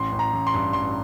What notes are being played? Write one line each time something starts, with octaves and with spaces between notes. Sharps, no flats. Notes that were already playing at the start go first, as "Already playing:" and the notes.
Already playing: A1 C6
A1
A#5
A1
C6
G2
A1 C6